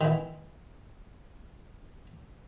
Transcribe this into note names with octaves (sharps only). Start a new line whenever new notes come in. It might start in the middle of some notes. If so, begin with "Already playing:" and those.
D#3 E3